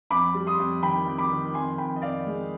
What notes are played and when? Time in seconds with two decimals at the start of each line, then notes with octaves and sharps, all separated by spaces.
0.10 F2 B5 D6
0.35 G3
0.47 C6 D#6
0.59 F2
0.82 D#3 G5 B5
1.07 F2
1.18 B5 D6
1.31 D#3
1.49 D6
1.54 F2 G#5 C6
1.78 F2 G5 B5
1.96 D#5
2.02 F2 D5 F5
2.27 G#3